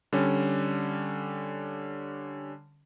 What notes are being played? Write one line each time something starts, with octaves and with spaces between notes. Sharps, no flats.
D3 G3 C#4